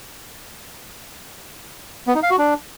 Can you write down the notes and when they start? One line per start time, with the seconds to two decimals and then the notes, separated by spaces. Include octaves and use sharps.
2.07 B3
2.15 D#4
2.23 F5
2.31 F#4
2.38 D4